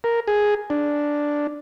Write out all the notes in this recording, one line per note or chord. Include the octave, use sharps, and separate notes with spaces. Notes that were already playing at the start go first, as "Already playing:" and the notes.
A#4
G#4
D4